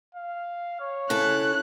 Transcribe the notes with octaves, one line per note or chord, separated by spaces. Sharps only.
F5
C#5
C#3 E4 A4 F#6